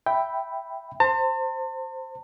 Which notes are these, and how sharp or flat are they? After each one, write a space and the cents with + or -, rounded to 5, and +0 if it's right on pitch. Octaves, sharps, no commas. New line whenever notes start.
E5 +0 G5 +0 B5 +0
C5 +0 A5 +45